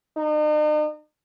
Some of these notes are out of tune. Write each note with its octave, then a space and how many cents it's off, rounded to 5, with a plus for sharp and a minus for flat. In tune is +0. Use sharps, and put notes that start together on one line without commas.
D#4 -45